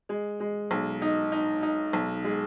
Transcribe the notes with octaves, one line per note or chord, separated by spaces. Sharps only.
G#3
G#3
B1
D#4
D#4
D#4
B1
G#3